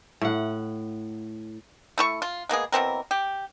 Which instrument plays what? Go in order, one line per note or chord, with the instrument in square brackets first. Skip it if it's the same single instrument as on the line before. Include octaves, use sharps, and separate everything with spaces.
[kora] A2 F#5
[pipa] A3 E4 C#6
F4
G#3 A#3 B3 G#4
B2 E3 C4 A#4
G4